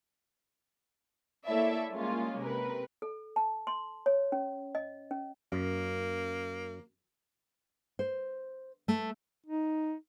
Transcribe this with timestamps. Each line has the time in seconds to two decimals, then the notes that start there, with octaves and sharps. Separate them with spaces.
1.46 A#3 E4 A4 C#5 D5 E5
1.92 G3 G#3 A#3 C#4 F4
2.39 C3 A#4 B4
3.02 A4
3.36 A5
3.67 C6
4.06 C#5
4.32 C#4
4.75 D#5
5.11 C#4
5.52 F#2 A#3
7.99 C5
8.88 A3
9.46 D#4